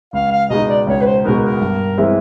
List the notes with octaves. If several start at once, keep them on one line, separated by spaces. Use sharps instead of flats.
C#2 F5
F5
B2 G#3 B3 D#4 D#5
D5
C#2 C#5
B4
C5
B2 G#3 B3 D#4 A#4
A#4
G2
E3 G#3 C4 E4